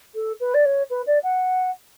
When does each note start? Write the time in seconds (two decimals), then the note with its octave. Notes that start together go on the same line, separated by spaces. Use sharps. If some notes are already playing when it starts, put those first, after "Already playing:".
0.15 A4
0.40 B4
0.54 D5
0.65 C#5
0.90 B4
1.07 D5
1.23 F#5